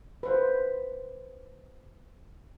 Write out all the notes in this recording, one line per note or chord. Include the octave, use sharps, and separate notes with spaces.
B4 C5